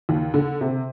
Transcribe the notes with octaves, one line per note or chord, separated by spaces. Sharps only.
D#2
D3
C3